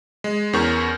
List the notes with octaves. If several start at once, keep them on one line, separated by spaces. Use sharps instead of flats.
G#3
E2 C#4 A#4 C#6 G6